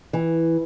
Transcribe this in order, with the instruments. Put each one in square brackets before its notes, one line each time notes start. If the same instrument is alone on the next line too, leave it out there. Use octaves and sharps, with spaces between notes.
[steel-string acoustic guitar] E3